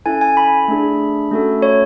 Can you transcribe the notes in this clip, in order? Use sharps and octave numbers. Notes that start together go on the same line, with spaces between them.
C#4 E4 A4 G#5
G#5
B5
A3 D4 G#4
A3 C#4 F#4 A4
C#5